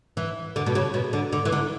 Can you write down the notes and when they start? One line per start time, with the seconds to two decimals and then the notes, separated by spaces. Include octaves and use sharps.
0.17 E3
0.56 D3
0.66 B2
0.75 C#3
0.94 B2
1.13 D3
1.33 D3
1.45 E3
1.52 D3